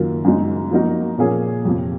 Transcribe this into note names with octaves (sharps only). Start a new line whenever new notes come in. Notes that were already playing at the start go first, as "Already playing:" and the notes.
Already playing: F#2 D#3 F#3 A#3 F4
F#2 C#3 G#3 D#4 F#4
F3 A#3 D#4 F#4 A#4
A#2 F3 A#3 C#4 G#4
F2 C3 F3